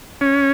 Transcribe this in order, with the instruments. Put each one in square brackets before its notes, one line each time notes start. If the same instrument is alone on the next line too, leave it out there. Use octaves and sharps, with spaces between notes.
[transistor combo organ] C#4